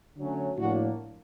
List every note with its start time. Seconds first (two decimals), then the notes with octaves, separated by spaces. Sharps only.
0.17 D3 F#3 A3 C#4
0.57 A2 F3 A#3 D4 F#4